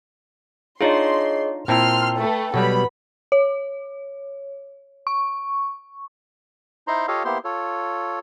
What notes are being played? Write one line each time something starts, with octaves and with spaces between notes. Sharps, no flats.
D4 D#4 F4 G#4 C#5 D#5 C6
A#2 C4 E4 G5 A5 C6 E6 F6
A3 A4 B4
B2 F#3 G3 B3 B5
C#5
C#6
D#4 E4 C5 A#5 C6
F4 G4 A4 C#5 D#5 F5
A#3 B3 E4 G4 C5 C6
F4 A4 C#5